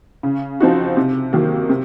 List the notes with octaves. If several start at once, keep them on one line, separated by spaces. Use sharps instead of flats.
C#3
F3 C4 D#4 F#4
C3
D#3 F#3 A#3
C3